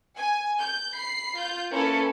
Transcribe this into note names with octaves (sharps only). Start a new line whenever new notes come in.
G#5
G6
B5 C7
F4 G6
A#3 C#4 E4 A4 B4